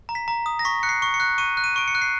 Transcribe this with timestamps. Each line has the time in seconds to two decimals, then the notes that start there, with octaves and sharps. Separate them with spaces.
0.09 A#5
0.15 B6
0.28 A#5
0.46 D#6
0.59 A#6
0.65 C#6 B6
0.83 F#6 C#7
0.89 C7
1.02 C#6
1.14 C#7
1.20 F#6
1.38 C#6 D#7
1.57 F#6
1.64 D#7
1.76 C#6 D7
1.88 C#7
1.95 F#6
2.02 C7